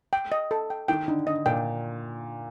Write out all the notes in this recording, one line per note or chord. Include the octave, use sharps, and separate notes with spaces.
G5
D#5
A4
G5
D#3 G5
D3 D#4
D3 D#5
A#2 G5